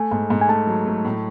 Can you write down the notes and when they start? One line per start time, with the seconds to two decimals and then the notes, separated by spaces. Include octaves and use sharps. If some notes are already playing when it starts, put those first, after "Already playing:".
Already playing: A3 G#5
0.11 G#2
0.30 G#2
0.41 G#5
0.49 A3 A5
0.67 F#3
0.86 A3
1.05 A2